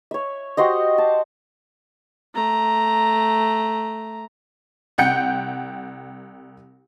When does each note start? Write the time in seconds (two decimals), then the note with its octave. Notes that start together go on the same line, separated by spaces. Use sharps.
0.11 C#5 E5
0.57 F#4 G4 C5 D#5
0.98 A5
2.35 A3 A#5
4.98 C2 F#5 G5 G6 C#7